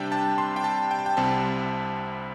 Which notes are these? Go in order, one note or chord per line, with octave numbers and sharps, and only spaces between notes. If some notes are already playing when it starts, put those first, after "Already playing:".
Already playing: C3 G3 D4 G5 A5
A5
C6
G5
A5
G5
A5
G5
C2 C3 G3 C4 A5